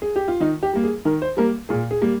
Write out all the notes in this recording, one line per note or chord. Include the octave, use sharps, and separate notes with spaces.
G#4
G4
F4
D#3 D#4
G4
G3 A#3
G#4
D#3 A#4
C5
G3 A#3 A#4
A#2 G#4
G#4
G3 A#3